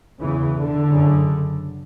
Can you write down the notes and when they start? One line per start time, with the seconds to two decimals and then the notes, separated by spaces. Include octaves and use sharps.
0.21 E2 C#3 E3
0.57 D3
0.92 F#2 C#3